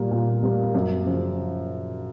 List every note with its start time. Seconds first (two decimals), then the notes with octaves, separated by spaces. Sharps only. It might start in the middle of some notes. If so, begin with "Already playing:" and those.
Already playing: A#2 G3 A#3
0.11 A#2
0.42 G3 A#3
0.74 F#2
1.06 C#3 F3